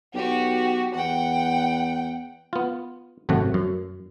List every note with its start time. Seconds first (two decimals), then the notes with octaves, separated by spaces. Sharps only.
0.14 B1 F#4 G4
0.95 E2 F#5 G5
2.53 B3 F4
3.29 G#1 F#2 C3 A3 F#5
3.54 F#2